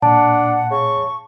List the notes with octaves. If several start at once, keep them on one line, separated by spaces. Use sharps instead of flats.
A#2 D4 F#5 A5
C#3 C#6